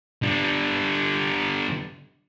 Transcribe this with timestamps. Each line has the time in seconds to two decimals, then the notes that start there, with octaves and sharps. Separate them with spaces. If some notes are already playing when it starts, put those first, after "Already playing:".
0.23 D3 G3